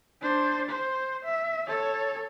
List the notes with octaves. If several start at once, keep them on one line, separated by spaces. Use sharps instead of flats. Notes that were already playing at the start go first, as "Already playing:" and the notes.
D4 C5
C5
E5
A4 C#5